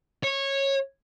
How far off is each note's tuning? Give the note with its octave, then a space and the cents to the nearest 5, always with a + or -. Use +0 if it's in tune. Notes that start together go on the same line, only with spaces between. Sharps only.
C#5 -15